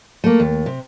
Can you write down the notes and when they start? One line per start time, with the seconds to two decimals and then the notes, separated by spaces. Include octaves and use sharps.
0.24 A3 A#3
0.40 D#2
0.66 C3